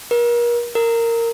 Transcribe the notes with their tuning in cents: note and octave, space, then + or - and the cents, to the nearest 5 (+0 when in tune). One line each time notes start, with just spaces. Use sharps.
A#4 +35
A#4 -15